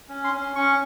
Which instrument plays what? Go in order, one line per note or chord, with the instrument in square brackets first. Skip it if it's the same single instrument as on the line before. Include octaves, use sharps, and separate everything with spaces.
[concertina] C#4
C6
C#4
C#4 C#6